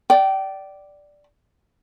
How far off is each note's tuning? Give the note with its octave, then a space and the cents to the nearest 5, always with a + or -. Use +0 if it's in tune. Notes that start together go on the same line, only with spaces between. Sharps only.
D5 +0 G5 -30